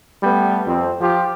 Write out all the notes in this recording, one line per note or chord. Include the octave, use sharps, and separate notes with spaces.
G3 A3 B3
F2 F3 C4
F3 F4 G4